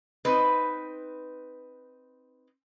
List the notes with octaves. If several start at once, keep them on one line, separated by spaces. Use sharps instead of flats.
C4 D#4 B4